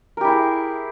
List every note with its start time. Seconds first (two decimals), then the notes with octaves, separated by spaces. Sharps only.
0.17 A#4
0.21 G4
0.25 E4
0.28 G#4